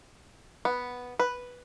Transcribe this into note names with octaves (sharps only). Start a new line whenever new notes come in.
B3
B4